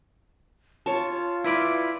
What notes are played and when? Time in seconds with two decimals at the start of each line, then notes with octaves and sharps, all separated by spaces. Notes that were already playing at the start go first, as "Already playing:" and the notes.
0.86 F4 C#5 A5
1.44 E4 B4 D5